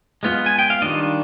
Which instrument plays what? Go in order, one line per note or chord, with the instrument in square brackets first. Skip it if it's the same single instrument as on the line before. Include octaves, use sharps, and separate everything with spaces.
[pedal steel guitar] G#3 B3 F4
G#5
G5
F5
D#3 G3 D4 F4 D#5